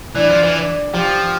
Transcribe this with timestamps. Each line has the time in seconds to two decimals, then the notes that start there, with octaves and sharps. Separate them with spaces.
0.15 E3 D4
0.30 F3
0.43 E3
0.55 D4
0.93 F3 G4